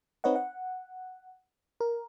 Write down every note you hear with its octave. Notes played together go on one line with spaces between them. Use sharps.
C4 D#4 B4 C#5 D#5 F#5
F#5
A#4